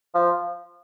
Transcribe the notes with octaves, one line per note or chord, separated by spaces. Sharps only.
F3